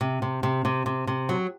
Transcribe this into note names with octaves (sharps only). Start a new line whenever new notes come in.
C3
C3
C3
C3
C3
C3
F#3